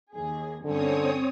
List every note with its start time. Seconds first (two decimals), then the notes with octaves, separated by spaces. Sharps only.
0.13 D#2 G#4
0.64 G2 D3 C4 C#4 C#5 D#6